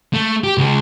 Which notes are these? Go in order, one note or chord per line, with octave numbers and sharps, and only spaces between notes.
A3
G4
C#2 G#4